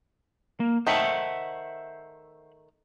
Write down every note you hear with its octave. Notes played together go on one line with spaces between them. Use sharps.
A#3
D#3 A3 C5 E5 F#5